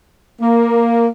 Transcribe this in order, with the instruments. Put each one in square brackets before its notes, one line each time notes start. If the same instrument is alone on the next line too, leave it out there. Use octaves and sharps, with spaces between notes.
[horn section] A#3